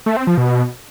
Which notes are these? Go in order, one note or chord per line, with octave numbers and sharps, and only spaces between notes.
A3
C4
F3
B2